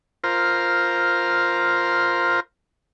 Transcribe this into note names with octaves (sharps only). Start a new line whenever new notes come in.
F4 A#4 C5